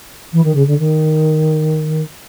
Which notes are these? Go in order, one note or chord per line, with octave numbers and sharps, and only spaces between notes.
E3
D#3
C#3
D3
D#3